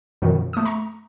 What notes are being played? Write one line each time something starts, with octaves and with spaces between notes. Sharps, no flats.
F#2 B2 D#3 F3
A3 D#6
A#5 C#6